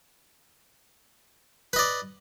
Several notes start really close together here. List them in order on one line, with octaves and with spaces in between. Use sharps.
B4 D#5 D5